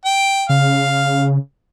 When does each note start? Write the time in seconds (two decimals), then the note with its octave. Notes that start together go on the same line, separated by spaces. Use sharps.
0.05 G5
0.49 C#3 F5